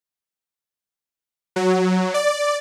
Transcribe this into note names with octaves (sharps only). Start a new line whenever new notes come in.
F#3
D5